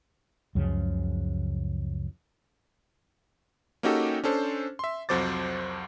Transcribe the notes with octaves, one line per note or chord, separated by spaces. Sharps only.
C#2 F#2 C#3 F3
A#3 C#4 D#4 F#4 G4 A4
C#4 D4 A4 C5
E5 C6
C2 F2 F#3 C5 D6 A6